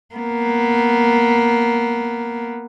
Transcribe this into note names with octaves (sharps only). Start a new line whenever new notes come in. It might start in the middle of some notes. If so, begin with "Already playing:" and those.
A#3 B3